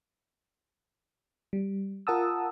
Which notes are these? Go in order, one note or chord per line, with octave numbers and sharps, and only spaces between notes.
G3
F4 A#4 F#5 A5 D#6 E6